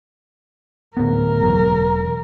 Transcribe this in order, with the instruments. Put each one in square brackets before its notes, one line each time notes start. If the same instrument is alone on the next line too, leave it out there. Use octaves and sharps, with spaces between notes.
[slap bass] D1 B3 [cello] A#4
[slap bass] E1 C2 F#3